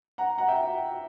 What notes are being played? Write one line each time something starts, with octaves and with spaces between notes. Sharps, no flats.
F#5 A#5
F#5 A#5
E5 G5